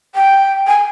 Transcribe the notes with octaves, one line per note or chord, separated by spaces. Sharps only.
G5
G#5